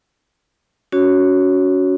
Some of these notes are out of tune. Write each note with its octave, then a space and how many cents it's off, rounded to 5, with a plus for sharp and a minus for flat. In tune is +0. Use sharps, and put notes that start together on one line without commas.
C#4 +25 F#4 +0 C#5 +0